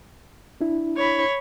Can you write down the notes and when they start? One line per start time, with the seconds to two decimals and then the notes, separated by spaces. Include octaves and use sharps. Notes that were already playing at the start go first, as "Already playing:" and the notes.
0.61 D4 E4
0.97 C#5 B5